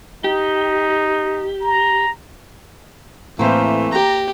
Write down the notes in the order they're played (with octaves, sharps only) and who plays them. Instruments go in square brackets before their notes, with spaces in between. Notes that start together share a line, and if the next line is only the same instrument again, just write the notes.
[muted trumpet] D#4 [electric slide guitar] G4
[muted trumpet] A#5
[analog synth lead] A2 [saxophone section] E3 A3 C4 [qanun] A#3 C5
[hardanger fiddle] G4 [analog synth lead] A#5